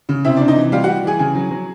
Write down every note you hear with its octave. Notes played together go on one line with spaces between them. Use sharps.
C#3
C3 E4 E5
C3 D4 D5
D#4 D#5
E3
G3 F4 F5
G3 F#4 F#5
E3 G#4 G#5
C#3 G#4 G#5
F#3
F#3